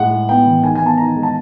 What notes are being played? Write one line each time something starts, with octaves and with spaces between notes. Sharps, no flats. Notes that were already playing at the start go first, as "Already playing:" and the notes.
Already playing: A2 G#3 F#5
G#3
B3 G5
E3
D#3 G#5
G#5
B3
A5
D#3 A#5
G#3
A5